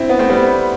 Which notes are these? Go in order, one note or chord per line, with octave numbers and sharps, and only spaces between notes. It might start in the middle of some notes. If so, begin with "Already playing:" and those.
Already playing: C4 E4
B3
A3 C4
G3 B3